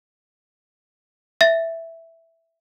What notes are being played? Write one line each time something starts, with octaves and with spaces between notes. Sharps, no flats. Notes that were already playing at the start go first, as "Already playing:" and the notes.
E5 A6